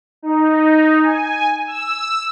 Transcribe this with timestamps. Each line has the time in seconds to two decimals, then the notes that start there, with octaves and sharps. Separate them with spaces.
0.23 D#4
1.03 G#5
1.67 E6